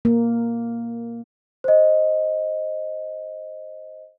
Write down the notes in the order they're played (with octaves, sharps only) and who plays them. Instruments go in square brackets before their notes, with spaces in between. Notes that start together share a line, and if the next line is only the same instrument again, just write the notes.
[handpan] A#3
[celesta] C5 D#5